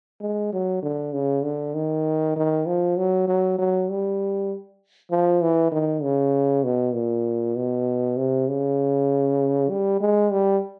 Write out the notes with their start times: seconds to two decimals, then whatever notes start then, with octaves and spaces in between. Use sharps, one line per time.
0.21 G#3
0.53 F#3
0.82 D3
1.13 C#3
1.44 D3
1.74 D#3
2.36 D#3
2.66 F3
2.97 F#3
3.28 F#3
3.58 F#3
3.89 G3
5.11 F3
5.42 E3
5.72 D#3
6.03 C#3
6.64 B2
6.94 A#2
7.56 B2
8.17 C3
8.48 C#3
9.70 G3
10.01 G#3
10.32 G3